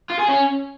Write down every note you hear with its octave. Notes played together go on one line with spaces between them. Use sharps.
F4
G#4
C#4